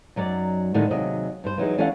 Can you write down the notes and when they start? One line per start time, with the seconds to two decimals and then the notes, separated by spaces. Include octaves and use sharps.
0.16 F#2 F#3 D#4 D5
0.74 A2 D3 D#3 G#3 D#4
0.91 D#2 C3 F#3 G#4 D#5
1.44 G2 C5
1.58 E3 F#3 D#4 G#4
1.78 E3 C#4 A4 D5 F5 F#5